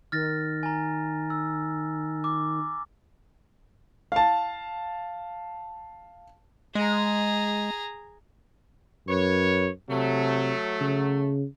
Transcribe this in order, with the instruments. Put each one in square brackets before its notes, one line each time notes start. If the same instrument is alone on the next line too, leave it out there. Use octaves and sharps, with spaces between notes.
[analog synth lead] D#3 [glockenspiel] F6 A6 A#6
[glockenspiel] G#5 A#5
E6
D6
[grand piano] F5 A5
[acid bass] G#3 [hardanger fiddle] G#4 A#5
[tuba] F#2 [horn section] B4 C#5
[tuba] C3 [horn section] F#3 A3
[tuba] C#3